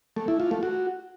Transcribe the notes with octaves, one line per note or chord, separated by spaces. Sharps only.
A3
E4
F4
A3
F#4